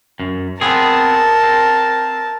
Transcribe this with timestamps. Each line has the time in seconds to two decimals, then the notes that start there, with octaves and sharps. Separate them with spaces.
0.20 F#2
0.61 B3 C4 G#4 A#4 A5
1.43 C4